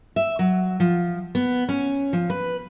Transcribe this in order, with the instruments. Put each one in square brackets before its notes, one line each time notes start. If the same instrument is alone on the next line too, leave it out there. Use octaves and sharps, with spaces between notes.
[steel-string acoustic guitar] E5
F#3
F3
B3
C#4
F3
B4